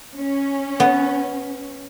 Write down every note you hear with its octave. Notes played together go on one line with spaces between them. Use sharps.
C#4
B3